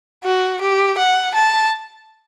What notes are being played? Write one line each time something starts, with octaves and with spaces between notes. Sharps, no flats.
F#4
G4
F#5
A5